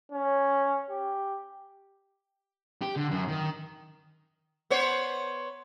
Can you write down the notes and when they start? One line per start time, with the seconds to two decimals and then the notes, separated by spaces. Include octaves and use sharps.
0.12 C#4
0.91 G4
2.82 G4
2.96 D3
3.11 F#2
3.28 D#3
4.70 B3 C5 C#5